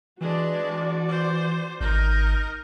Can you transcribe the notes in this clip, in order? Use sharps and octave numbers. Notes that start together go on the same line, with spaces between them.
E3 G#3 D4 F#4 D5
C5
G#1 D#4 A#4 G6